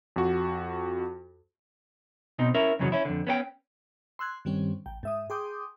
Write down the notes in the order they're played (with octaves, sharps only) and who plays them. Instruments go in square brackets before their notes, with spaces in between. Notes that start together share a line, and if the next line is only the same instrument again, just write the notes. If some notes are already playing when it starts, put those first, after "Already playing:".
[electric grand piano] F2 F#4
[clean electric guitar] B2 C4 D#4
C#4 E4 A#4 E5
F2 G#2 C#3 E3 F#3
C#4 E4
F2 D3
B3 C#4 F#4 G5
[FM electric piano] C6 E6 F#6 G#6
G2 D#3 G3 C4 C#4
A1 G5
G#2 E5 D#6
G#4 G5 C6 D6 D#6 G6